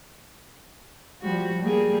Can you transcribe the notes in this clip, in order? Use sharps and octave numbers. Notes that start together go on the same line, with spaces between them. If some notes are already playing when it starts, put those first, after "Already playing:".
F3 G3 F#4
G3 A#3 G#4